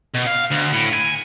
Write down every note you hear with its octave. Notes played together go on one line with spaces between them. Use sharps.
B2
F5
D2
A2
G#5